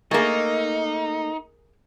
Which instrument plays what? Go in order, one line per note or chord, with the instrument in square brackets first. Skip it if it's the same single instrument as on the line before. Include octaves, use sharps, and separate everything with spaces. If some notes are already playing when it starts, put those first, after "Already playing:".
[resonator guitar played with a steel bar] A3 A#3 [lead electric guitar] D#4 [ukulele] G#4 A#4